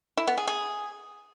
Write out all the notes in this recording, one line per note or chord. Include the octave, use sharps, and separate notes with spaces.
E4
B3
G#4
G#4